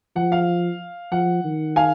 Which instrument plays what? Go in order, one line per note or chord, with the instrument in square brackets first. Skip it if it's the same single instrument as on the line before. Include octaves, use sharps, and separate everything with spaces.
[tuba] F3 [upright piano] F#5
[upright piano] F5
[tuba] F3 [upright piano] F#5
[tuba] D#3
[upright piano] F5 G#5